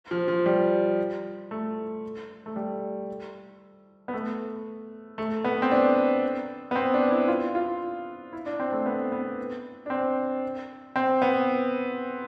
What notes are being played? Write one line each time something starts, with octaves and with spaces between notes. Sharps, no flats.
F3
F3
G3
A3
A3
G3
B3
A3
A3
B3
C4
D4
B3
C4
D4
E4
F4
F4
E4
D4
C4
A3
B3
B3
D4
C4
C4
B3